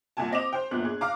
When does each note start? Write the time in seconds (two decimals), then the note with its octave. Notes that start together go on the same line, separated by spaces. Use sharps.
0.17 C2 A#2 G#5 A5
0.31 C4 D#5 D6 F7
0.53 C5 G5
0.71 G1 A#2 B3 F#6
0.85 G#4
1.01 F5 A#5 D6